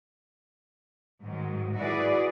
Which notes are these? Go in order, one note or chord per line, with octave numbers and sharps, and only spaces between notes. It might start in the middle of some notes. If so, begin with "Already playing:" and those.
G#2 D#3 F#3
E4 F#4 G#4 B4 D5